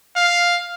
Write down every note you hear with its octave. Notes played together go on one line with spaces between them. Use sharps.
F5